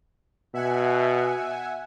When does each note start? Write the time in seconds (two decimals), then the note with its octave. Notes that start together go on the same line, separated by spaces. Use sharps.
0.54 B2 E5 F#5 G#5